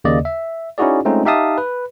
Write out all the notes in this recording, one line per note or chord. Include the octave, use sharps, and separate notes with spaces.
D#2 C#3 A#3 D5 D#5
E5
C#4 D#4 E4 F#4 G#4 D5
G#3 A3 C4 C#4 D#4 F4
D#4 G4 E5 F5 A5 D#6
B4